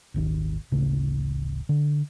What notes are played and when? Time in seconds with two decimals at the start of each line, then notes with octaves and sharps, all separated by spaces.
0.14 D#1 G#1 D#2
0.72 D1 A1 C#3 A3
1.69 D3